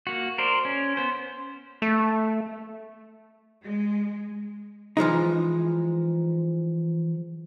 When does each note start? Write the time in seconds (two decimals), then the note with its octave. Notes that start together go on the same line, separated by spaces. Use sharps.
0.07 A#3 F#4
0.38 A#4 C5 D5
0.65 C#4
0.97 B3 C5
1.82 A3
3.63 G#3
4.97 E3 F3 G#3 D#4